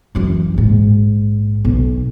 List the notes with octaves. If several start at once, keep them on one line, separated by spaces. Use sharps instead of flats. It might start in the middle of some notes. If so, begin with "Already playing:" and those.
F#2 E3
A#1 G#2
B1